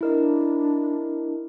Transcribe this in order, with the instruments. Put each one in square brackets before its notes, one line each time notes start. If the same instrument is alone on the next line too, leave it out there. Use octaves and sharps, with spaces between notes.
[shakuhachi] D4 [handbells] E4 A#4 D#5